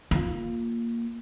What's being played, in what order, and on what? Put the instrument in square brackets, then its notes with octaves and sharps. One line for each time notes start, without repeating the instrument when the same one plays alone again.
[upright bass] A#3 F4